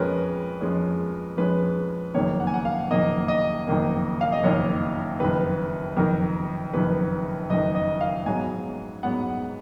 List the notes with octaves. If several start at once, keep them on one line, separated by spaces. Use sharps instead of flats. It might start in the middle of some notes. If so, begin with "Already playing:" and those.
Already playing: F2 F3 G#3 C#4 A#4 B4
F2 F3 G#3 C#4
F2 F3 G#3 C#4 B4
F#1 F2 D#3 A#3 C#5
F#5
G#5
F#5
F5
F#1 F2 D#3 A#3 D#5
D#5
F#1 F2 D#3 A#3
F5
D#5
F#1 F2 D#3 A#3 C#5
F#1 F2 D#3 B4
F#1 F2 D#3 A#4
F#1 F2 D#3 B4
F#1 F2 D#3 D#5
D#5
F5
G#2 F#3 B3 G#5
G#2 F#3 B3 F#5